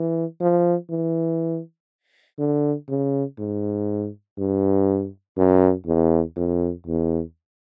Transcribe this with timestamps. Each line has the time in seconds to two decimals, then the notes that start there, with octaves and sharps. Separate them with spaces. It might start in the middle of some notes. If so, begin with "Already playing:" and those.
Already playing: E3
0.40 F3
0.90 E3
2.39 D3
2.89 C#3
3.38 G#2
4.38 G2
5.37 F#2
5.86 E2
6.36 F2
6.86 E2